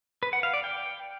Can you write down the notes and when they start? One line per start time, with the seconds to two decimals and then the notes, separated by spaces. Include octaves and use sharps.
0.23 B4
0.33 F#5
0.43 F5
0.54 D5
0.64 G5